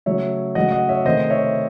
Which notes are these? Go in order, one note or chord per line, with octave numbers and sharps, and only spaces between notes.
C#3 F#3 A3 C#5 E5
C#3 F#3 A3 D#5 F#5
D#5 F#5
C#5 E5
C3 D#3 A3 C5 D#5
C#5 E5